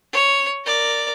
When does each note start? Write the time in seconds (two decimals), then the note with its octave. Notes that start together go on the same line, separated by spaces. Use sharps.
0.13 C#5
0.65 A#4 D5